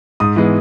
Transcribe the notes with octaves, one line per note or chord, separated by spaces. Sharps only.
G#2 D#6
E3 G#3 B3